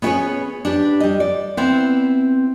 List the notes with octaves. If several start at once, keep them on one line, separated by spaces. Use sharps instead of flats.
B3 C#4 E4 G#4 B4 C#5
D4 G4 B4
G3 D#5
D5
B3 C4 E4